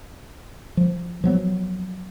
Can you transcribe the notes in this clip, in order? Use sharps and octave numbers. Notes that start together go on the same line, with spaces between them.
F3
F3 F#3 B3